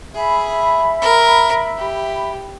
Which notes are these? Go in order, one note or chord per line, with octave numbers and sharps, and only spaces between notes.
G#4 E5 B5
A#4
G4